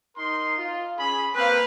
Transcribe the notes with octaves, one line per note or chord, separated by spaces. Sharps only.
D#4 A#4 C6
F4
C#4 G#4 B5
A#3 C4 B4 F5